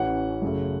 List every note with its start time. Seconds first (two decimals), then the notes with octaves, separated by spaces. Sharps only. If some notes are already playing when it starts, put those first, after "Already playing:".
Already playing: A1 A2 E3 C#4 F#5
0.42 F#2 C#3 A3